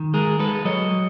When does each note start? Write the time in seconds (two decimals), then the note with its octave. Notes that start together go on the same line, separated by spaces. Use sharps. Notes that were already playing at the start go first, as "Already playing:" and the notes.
Already playing: D#3
0.14 G#3 G#4 A#4
0.39 G#3 A4 B4
0.65 F#3 C#5 D#5